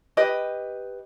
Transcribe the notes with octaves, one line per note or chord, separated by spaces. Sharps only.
G4 B4 D#5